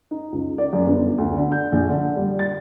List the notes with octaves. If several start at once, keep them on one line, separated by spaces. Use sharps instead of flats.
D#4
C#2
D5
F#2
G1
D2
D3
G6
A#1
D3
G3
A6